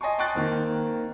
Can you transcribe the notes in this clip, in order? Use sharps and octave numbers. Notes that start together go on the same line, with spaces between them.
D#5 G#5 A5 C6 C#6
G5 A5 C6 C#6 F#6 A6
D#3 A#3 C4